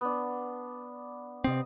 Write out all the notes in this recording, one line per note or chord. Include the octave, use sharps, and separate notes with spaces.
B3 D4
C3 C4 D#5 D#6